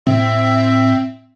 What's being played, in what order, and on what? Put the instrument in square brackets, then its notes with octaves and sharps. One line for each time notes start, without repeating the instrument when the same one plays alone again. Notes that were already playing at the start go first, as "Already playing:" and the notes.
[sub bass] A2 [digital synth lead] C4 [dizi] E5